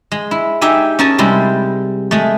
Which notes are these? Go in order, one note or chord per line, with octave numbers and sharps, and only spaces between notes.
G#3
E4
D#4 G4 E5 G#5
C#4 G#4 A#4 G#5 A5
C3 G3 G#3 E4
G#3 A3